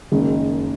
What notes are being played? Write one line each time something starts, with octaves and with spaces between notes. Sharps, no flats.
F#1 F#2 D#3 G#3